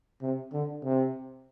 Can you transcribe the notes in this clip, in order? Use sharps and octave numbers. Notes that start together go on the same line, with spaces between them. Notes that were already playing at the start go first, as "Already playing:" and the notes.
C3
D3
C3